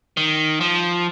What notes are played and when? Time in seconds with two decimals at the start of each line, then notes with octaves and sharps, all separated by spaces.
0.17 D#3
0.61 F3